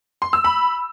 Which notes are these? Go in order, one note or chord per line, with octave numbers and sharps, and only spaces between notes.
C6
E6
B5